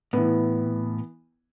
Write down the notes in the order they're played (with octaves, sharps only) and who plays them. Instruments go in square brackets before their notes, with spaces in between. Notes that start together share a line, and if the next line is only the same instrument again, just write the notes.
[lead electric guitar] A2 [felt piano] E3 B3